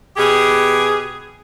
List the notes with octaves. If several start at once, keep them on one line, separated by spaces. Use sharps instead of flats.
B2 G4 G#4